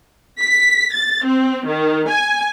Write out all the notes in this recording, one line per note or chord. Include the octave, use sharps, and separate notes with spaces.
B6
A6
C4
D#3
G#5